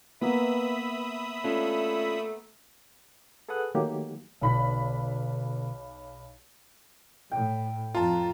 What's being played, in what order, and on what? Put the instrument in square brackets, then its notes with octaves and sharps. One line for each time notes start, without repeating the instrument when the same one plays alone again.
[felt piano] A#3 B3 [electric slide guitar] B4 [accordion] E5 B5 D#6
[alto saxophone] A3 [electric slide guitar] C#4 D4 F4
[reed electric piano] G#4 A4 B4 F#5 D#6 F#6
D#3 F#3 A3 A#3 G4
[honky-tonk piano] B1 B5 B6 [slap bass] B2 D3
[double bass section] A2 [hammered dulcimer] G5
[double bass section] F2 [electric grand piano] F4 A5 [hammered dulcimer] A#5